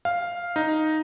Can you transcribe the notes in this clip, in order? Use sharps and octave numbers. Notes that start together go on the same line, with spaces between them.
F5
D#4